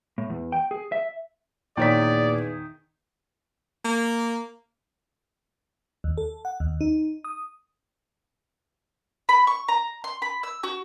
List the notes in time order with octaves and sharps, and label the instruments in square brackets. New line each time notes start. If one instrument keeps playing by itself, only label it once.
[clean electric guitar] A2
E2
G5
G#4
E5
[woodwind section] E2 G#4 [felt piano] A#2 C#5 B6 [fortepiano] D#3 [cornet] D5
[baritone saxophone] A#3
[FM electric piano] D#2
A4
F#5
D#2
D#4
D#6
[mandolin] B5
C#6
A#5
C6
B5
E6
F#4